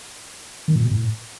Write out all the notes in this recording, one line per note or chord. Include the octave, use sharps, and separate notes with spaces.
D#3
A#2
B2
A2